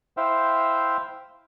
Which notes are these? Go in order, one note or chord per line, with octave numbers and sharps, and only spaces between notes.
E4 C5 E5 F5 G5